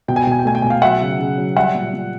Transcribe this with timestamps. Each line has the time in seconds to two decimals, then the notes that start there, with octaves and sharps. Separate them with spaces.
0.08 B2 G5
0.16 G#5
0.24 G5
0.27 B2 G#5
0.39 G5
0.45 A3 G#5
0.55 G5
0.62 B2 G#5
0.70 F5 G5
0.82 F#3 E5 F#5
1.01 C#3
1.19 C#3
1.38 F#3
1.56 G3 E5 F#5
1.75 A#2
1.93 A#2